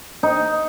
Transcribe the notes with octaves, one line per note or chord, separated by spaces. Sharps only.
D#4